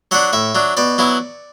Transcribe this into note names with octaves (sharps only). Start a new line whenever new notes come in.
F#3 D4 F#5
A2 E5
F#3 D4
B2 D5
F#3 B3 E4